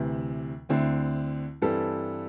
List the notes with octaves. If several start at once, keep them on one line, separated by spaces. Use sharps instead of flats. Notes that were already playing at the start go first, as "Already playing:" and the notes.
Already playing: D2 C3 E3
D2 D3 C4 E4
G2 E3 G3 C4 A4